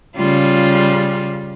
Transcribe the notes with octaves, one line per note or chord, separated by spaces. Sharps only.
C#3 G3 F4